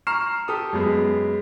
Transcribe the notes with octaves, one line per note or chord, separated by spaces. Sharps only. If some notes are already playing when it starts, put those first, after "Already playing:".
A#5 C#6 F6 C7 E7
G4 A4 D#6
F#2 G#3 B3